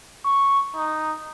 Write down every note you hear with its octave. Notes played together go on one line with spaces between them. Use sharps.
C#6
D#4